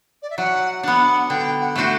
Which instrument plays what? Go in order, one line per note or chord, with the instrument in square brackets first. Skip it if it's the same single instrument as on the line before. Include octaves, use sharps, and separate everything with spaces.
[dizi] D5
E5
[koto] F#3 [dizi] F#5
[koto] B3 D4 [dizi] F#5
[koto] D3 [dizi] G5
[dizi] F#5
[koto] A3 D4 F#4 C5